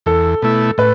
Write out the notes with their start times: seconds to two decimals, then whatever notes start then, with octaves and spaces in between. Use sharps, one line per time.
0.06 E2 A4
0.42 B2 A3 E4
0.78 A2 B4